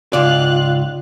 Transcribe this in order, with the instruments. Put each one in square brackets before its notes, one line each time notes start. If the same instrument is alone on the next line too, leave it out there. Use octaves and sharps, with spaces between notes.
[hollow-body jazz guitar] C#2 G#2 D5 [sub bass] C#3 [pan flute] F4 [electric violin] F5 F#6